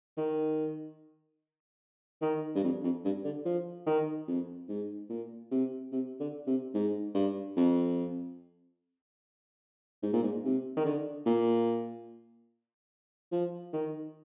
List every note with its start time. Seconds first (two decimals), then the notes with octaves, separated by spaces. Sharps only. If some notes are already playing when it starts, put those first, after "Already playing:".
0.17 D#3
2.22 D#3
2.55 G2
2.64 F2
2.84 F2
3.05 G2
3.24 D3
3.45 F3
3.87 D#3
4.27 F2
4.68 G#2
5.09 A#2
5.51 C3
5.92 C3
6.20 D3
6.47 C3
6.74 G#2
7.15 G2
7.56 F2
10.03 G#2
10.13 A#2
10.23 G#2
10.44 C3
10.77 D#3
10.85 D3
11.26 A#2
13.32 F3
13.73 D#3